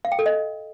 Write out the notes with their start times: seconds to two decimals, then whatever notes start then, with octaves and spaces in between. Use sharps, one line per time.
0.05 F5
0.12 G5
0.19 A4
0.26 D#5